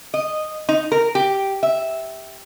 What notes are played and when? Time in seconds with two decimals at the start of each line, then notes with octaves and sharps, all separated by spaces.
0.14 D#5
0.69 D#4
0.92 A#4
1.15 G4
1.63 E5